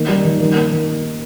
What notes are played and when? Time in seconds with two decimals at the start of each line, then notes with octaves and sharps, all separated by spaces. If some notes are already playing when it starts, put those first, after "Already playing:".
Already playing: D#3 A#3 C7
0.08 G3
0.25 D#3
0.40 D#3
0.55 A#3
0.72 D#3